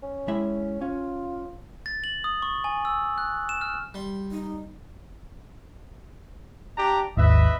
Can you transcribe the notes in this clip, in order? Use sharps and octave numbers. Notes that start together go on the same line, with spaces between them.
C#4
G#3 E4 E5
C#4 F4
A6
F#7
D#6
C#6
G#5
E6
F#6
E7
F6
G3 C6
D#4
D4 G4 A#5
G#1 D#2 B4 D#5 E5